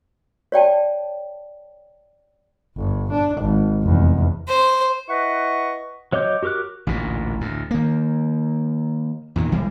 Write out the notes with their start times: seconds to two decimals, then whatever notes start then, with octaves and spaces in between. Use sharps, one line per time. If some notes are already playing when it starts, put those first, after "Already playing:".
0.52 C#5 D5 G5 A5
2.76 G1
3.12 D4
3.41 G#1
3.83 F1 E2
4.48 C5
5.08 E4 B4 D#5 F#5 C#6
6.12 F#3 C#5 D#5 D6 G6
6.43 F#4 G4 A#4 D6 F#6
6.87 A1 D2 A#2
7.40 D2 A2
7.71 D#3 A#3
9.36 E2 A#2 D#3
9.52 B1 E3 G3 G#3